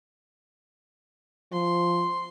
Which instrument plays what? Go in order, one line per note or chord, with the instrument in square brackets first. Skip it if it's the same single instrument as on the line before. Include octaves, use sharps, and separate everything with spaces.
[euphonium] F3 [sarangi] C6